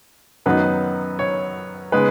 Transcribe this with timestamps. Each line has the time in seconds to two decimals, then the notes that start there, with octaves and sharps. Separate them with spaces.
0.46 F#2 D#3 F#3 B3 D#4 B4
1.19 C#5
1.92 C#3 G#3 B3 D#4 B4